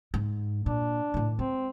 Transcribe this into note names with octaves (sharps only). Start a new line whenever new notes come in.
G#2
A#2 D4
A2 D#3
G#3 C4